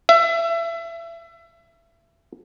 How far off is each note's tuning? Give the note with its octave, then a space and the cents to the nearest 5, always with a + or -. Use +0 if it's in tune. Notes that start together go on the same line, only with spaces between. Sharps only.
E5 +30